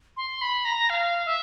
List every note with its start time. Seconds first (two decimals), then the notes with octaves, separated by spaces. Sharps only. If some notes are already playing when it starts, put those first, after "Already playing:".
0.17 C6
0.42 B5
0.65 A#5
0.90 F5
1.26 E5